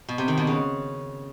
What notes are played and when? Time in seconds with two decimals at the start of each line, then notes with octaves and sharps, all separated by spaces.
0.09 B2
0.18 C3
0.28 D#3
0.37 B2
0.47 C#3